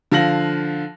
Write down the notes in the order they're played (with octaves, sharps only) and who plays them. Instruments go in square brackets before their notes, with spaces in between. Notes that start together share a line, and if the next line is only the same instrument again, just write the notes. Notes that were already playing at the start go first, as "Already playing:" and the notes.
[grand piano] D3 F3 F5 A#6 F#7